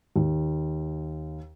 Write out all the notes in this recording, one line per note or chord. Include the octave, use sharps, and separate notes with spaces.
D#2